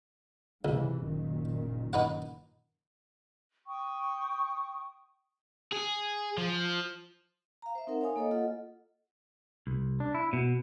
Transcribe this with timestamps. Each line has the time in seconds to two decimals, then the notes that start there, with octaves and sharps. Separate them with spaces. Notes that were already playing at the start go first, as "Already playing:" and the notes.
0.65 C#2 G#2 C3 E3
1.04 F#1 A#2 D#3
1.93 D#4 B4 F#5
3.66 G5 C#6 D#6
5.73 G#4
6.37 F3
7.62 F5 A#5
7.75 C5 E5
7.87 C4 D#4 A#4 F#5
8.01 C#5 F5 G#5 D#6
8.16 A#3 A4 C#5 D#5 F5
8.31 F4 A4 D#5 F#5
9.67 C2
10.00 D4
10.15 E4
10.33 B2